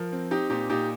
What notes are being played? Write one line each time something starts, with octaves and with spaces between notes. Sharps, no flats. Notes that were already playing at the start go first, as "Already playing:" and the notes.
Already playing: F3 A#4
C4
C4 D#4 G4
A#2 D#4 G4
A#2 D#4 G4